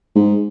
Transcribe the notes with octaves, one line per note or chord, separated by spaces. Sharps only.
G#2